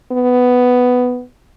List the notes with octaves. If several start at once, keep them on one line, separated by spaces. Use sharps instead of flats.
B3